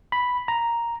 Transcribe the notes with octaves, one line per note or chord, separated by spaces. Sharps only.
B5
A#5